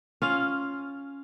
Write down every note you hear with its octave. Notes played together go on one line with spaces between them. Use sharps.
C#4 F4 F5